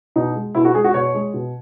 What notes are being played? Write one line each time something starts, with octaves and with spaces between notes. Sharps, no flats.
B2 D#4
G#3
B2 E4
F#4
G#3 G#4
F#4
B2 C#5
G#3
B2